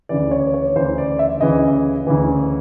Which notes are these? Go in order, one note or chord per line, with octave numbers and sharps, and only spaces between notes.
D2 C#3 E3 D5
C#5
C#5
D2 C#3 E3 C5
D5
E5
D2 C#3 E3 D#5
D2 C#3 E3